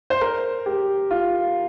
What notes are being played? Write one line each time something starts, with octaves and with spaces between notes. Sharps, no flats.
C5
A#4
G4
F4